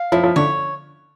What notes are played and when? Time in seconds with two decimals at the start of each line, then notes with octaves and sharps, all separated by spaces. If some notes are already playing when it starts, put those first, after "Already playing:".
Already playing: F5
0.12 F3 E4
0.23 F3
0.36 D3 C#5